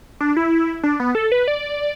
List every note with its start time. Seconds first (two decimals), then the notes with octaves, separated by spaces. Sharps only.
0.20 D4
0.37 E4
0.83 D4
1.00 B3
1.15 A4
1.32 B4
1.48 D5